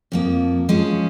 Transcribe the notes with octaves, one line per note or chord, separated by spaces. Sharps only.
F2 F3 A#3
F3 G#3 C#4